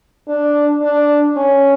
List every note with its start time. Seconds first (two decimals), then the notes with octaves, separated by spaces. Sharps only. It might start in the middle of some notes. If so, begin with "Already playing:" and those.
0.28 D4
0.82 D4
1.36 C#4